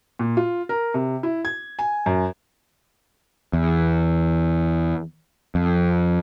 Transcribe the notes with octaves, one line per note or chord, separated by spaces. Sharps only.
A#2
F4
A#4
C3
E4
G#6
G#5
F#2
E2
F2